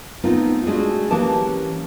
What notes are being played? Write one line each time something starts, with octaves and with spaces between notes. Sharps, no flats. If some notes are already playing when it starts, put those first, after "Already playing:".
A3 B3 C4 D#4 F4
G#3 A3 D4 F#4 G#4
E3 A#3 C#4 G4 B4 A5